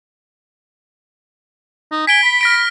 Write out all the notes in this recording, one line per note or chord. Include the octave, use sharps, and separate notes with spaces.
D#4
G#5 B6 D7 G7
B5
F6 A#6 D7